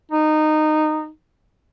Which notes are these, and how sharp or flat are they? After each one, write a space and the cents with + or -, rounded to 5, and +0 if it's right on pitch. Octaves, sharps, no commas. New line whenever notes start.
D#4 -15